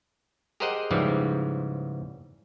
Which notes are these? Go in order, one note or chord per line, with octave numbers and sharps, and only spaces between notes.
G4 G#4 A#4 C5 D#5 F#5
G#2 C#3 E3 F3 G3